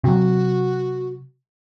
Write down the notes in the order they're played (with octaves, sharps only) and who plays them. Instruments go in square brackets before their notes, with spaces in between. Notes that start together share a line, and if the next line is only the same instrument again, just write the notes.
[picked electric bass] C3 F#3 [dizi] F#4